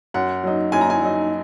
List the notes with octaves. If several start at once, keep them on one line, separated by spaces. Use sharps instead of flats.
F#2 F#5
F#3 D#4
F#2 G#5
A#5
G#5
F#3 D#4